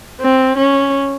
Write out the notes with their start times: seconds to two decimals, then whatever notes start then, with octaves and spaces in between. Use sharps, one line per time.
0.21 C4
0.57 C#4